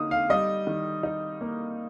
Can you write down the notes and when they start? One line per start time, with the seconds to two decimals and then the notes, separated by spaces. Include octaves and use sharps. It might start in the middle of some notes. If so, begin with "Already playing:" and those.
Already playing: D3 A#3 D#4 D#6
0.11 F5
0.30 G3 D#5
0.67 D#3
1.03 D#4
1.41 A#3